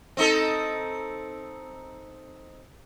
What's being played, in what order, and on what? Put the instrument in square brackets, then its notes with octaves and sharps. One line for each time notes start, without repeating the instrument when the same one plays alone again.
[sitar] C4 D#4 A4